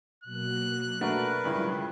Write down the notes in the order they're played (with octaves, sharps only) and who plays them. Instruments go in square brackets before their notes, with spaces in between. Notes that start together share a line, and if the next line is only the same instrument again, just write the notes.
[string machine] B2 F#3 A#3 [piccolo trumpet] F#6
[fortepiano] A3 D4 F#4 [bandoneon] A#4 B4
[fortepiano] G2 C#3 E4 [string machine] F#3 G#3 F4